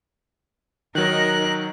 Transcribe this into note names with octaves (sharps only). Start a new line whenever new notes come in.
D#3 F#3 D#4 A#4 F#6